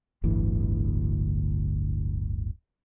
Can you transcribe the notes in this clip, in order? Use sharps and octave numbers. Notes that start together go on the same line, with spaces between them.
D1 G1 D2 E3